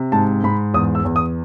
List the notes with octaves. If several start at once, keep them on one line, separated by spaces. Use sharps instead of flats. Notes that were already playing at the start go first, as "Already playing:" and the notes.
Already playing: C3
G#2 A5
G#2 B5
E2 D#6
E6
E2
D#6